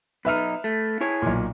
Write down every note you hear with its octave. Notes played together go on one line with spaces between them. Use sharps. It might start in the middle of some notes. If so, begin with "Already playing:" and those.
B1 D#4 B4 E5 F6
A3
E4 G#4 C#5
B1 A#2